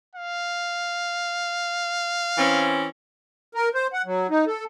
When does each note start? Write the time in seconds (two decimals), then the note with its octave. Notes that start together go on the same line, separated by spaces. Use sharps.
0.16 F5
2.38 E3 C4 C#4
3.55 A#4
3.74 C5
3.93 F#5
4.05 F#3
4.30 D#4
4.47 A4